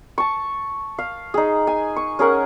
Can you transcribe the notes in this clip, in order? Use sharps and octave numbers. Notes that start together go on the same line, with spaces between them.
A5 C#6
F5
D#4 G#4
G#5
C#6
C#4 G#4 A#4 F#5